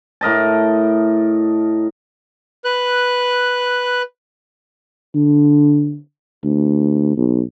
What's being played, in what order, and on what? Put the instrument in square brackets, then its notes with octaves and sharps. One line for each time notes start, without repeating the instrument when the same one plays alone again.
[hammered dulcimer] A2 A#4 D#5 A5
[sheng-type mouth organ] B4 F#6
[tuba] D3
D2
B1